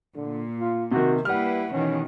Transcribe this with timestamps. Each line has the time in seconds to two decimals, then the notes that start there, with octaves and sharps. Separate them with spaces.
0.16 A#2 D3
0.60 F4
0.91 C3 D#3 F#4
1.25 G3 A#3 E4 B4 F#5 F6
1.72 B2 D#3 E3 C#4